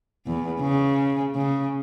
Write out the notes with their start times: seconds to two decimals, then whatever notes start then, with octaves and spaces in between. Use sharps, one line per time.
0.27 E2
0.60 C#3
1.35 C#3